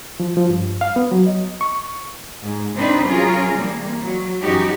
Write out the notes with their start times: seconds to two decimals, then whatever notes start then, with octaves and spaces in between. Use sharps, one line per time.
0.20 F3
0.37 F3
0.50 G2
0.81 F5
0.96 B3
1.11 F#3
1.26 D#5
1.61 C#6
2.42 G#2
2.76 C3 C4 D4 D#4 B4 C5
3.07 F#3 C#4 F4 G#4 A#4
3.51 C3 E3 G3 A#3
4.02 F#3
4.42 F#2 E3 D#4 F#4 G4